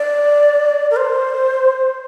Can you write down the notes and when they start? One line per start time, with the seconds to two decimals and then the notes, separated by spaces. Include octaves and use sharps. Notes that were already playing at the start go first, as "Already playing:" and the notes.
Already playing: D5
0.91 A#4
0.96 C5